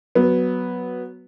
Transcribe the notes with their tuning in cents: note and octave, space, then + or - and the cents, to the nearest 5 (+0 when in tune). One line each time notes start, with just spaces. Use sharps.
F#3 +0 B3 +0